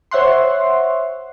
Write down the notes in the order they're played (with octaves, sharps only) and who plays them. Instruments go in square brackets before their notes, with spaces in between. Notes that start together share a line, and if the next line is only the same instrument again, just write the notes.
[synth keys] C5 C#5 E5 F#5 C6